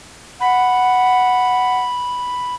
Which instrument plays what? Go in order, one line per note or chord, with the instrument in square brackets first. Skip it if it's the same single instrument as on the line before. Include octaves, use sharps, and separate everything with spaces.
[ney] F#5 [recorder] B5